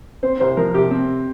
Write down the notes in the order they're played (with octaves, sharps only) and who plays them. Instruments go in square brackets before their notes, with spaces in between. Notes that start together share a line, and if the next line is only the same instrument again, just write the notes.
[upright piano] C4 [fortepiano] C5
[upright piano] C2 [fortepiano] C5
[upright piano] F3 [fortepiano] A#4
[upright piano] C3 [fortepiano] G4
[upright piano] C4